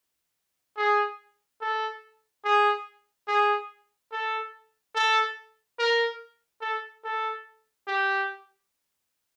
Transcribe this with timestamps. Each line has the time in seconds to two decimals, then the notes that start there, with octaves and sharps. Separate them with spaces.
0.77 G#4
1.61 A4
2.44 G#4
3.28 G#4
4.12 A4
4.95 A4
5.79 A#4
6.61 A4
7.04 A4
7.88 G4